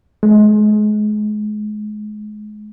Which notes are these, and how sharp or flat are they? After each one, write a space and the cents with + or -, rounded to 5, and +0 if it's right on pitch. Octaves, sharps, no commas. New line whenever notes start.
G#3 +30